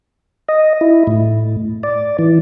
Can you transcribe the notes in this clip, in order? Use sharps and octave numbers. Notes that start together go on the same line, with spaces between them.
D#5
E4
A2
D5
E3